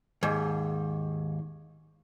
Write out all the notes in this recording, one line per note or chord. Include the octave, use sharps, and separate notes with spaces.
D#2 G#2